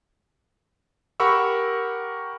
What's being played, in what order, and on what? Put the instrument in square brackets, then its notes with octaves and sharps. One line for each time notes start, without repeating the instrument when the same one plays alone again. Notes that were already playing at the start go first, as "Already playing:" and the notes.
[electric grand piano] G4 A#4 F#5 B5 C#6 E6